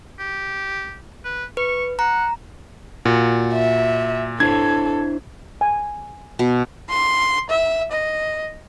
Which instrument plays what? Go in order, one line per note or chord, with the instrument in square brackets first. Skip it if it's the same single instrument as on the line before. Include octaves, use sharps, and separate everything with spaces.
[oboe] G4
B4
[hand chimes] B4 [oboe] C#6
[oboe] F#5 [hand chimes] A#5
[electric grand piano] A#2 [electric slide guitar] F#4
[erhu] E5
[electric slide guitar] D4 E4 C5 [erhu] A4 [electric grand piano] G#6
[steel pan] G#5
[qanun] B2
[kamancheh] C6
E5
D#5